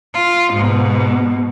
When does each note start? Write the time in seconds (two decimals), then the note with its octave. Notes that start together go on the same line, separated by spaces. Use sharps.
0.14 F4
0.53 G#2 B2